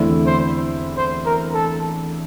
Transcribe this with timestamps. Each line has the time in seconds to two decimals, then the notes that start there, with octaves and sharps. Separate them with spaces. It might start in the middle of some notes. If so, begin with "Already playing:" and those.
Already playing: E2 D3 A3 C4 E4
0.27 C5
0.97 C5
1.26 A#4
1.54 A4